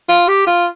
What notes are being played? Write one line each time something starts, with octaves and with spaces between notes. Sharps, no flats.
F4
G4
F4